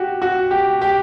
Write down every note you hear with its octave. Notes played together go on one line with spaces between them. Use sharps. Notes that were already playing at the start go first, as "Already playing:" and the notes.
Already playing: F#4 G4
F#4
G4
G4